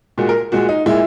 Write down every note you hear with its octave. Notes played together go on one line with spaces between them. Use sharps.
A#2 G#3 F#4
A#4
A#2 G#3 F#4
D#4
A#2 G#3 E4